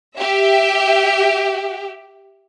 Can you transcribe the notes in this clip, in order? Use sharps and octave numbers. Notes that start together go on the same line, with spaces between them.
G4 E5